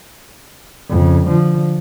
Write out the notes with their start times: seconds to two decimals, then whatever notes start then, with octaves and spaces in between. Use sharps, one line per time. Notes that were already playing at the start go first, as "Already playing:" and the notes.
0.89 F2 C#3
1.26 D3 F3